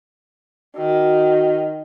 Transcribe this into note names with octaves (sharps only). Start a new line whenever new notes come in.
D#3 F#4